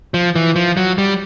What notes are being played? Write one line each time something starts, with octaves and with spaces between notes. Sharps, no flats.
F3
E3
F3
F#3
G3